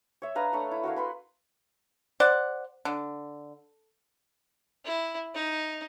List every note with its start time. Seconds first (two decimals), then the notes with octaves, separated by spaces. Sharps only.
0.22 C#5 E5
0.35 D4 B4 F5 A#5
0.53 A3 D4 C#5 B5
0.71 E4
0.84 F#4 A#4 C#5 F5
0.96 B4 B5 C6
2.20 C5 D5 F#5
2.85 D3
4.85 E4
5.35 D#4